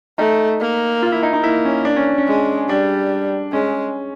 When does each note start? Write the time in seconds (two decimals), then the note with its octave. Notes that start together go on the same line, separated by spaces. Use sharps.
0.18 A3 D#4
0.60 A#3
1.02 F4
1.12 E4
1.23 D#4
1.33 D#4
1.43 A#3 E4
1.65 C#4
1.85 D4
1.96 C#4
2.18 C#4
2.27 G#3
2.69 G3 D4
3.52 G#3 C#4